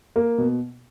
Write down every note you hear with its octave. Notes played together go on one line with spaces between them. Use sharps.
A#3
B2